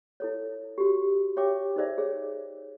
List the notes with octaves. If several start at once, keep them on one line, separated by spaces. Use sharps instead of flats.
E4 A4 C#5
F#4 G4
G4 C#5 E5 G5 D6
D#4 G#4 A#4 C5 D5 E5
G#4 C#5